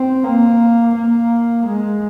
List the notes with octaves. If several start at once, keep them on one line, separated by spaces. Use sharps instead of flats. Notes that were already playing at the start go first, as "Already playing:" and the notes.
Already playing: C4
A#3
A#3
G#3